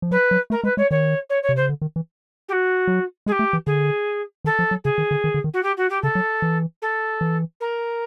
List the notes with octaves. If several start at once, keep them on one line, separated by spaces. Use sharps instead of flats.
F3
F#3 B4
F#3
A3 A#4
G#3 B4
G#3 C#5
D#3 C#5
C#5
C#5
C3
C#3 C5
D3
D#3
E3
G4
F#4
F#3
G#3 G#4
G4
A3
E3
D3 G#4
D#3 A4
F3
F#3
C#3 G#4
D#3
D3
D#3
D3
D#3
F#4
G4
F#4
G4
C#3 A4
F#3
E3
A4
E3
A#4